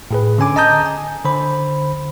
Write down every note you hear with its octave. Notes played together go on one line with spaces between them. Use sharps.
A2 G#4 B4
D3 C#4 G#5 D6
D#5 A5 A#5 D#6 G6
G#5
D3 C5 B5